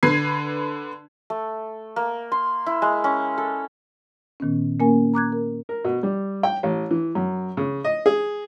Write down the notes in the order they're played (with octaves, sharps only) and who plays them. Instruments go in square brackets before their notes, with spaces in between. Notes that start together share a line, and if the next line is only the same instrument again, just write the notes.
[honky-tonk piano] D3 B4 G#6 C7
[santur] A3
A#3
C6
E4
G#3
C#4
A4
[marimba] A#2 D#3 B3 C#4
A#3 C#4 A#4 G#5
A#5 D6 F#6 G#6
A#4
[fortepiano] A#4
B2
G3
G5
A1
E3
F#2
C#3
D#5
G#4